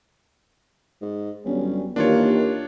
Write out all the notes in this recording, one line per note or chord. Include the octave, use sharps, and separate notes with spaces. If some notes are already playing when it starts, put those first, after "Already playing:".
G#2
G1 F#3 G3 C#4
D#2 D#3 E3 A#3 D4 F4 G4 C#5